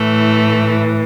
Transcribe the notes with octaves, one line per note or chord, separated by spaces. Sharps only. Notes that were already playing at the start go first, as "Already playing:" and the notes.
Already playing: A2 E3 A3